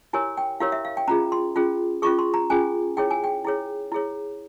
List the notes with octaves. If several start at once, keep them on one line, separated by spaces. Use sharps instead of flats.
E4 G4 A#4 C#5 G#5
G5
E4 G4 A#4 C#5 F5
E5
F5
G5
C#4 F4 G#4 A#5
C6
C#4 F4 G#4
C#4 F4 G#4 C#6
C6
A#5
C#4 F4 G#4 G#5
E4 G#4 C#5 G5
G#5
G5
E4 G#4 C#5
E4 G#4 C#5